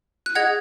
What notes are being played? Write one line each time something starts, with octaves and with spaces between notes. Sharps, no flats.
F#6
G#4 D#5 F#5 G#6